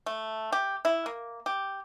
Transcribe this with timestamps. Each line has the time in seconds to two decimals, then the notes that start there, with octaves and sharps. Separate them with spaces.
0.06 A3
0.52 G4
0.85 E4
1.06 A#3
1.46 G4